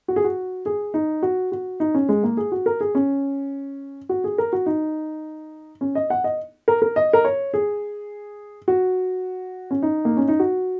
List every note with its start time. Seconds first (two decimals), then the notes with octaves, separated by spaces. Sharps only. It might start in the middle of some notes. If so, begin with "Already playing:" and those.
0.08 F#4
0.16 G#4
0.24 F#4
0.66 G#4
0.94 D#4
1.23 F#4
1.52 F#4
1.80 D#4
1.94 C#4
2.09 G#3
2.23 A#3
2.37 G#4
2.52 F#4
2.66 A#4
2.80 G#4
2.95 C#4
4.09 F#4
4.24 G#4
4.38 A#4
4.53 F#4
4.66 D#4
5.81 C#4
5.95 D#5
6.10 F#5
6.24 D#5
6.68 A#4
6.82 A#4
6.96 D#5
7.13 A#4
7.25 C#5
7.54 G#4
8.68 F#4
9.71 C#4
9.82 D#4
10.05 A#3
10.17 C#4
10.28 D#4
10.39 F#4